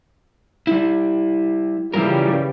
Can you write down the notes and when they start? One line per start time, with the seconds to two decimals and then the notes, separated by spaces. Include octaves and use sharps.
0.67 G3 E4
1.94 C#3 E3 G3 E4 F4 A#4